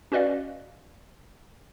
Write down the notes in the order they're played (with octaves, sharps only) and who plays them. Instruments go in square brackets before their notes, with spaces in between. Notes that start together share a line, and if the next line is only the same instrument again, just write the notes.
[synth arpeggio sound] C#4 F#4 B4 D5 D#5 F5